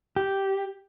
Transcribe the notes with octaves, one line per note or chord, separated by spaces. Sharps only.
G4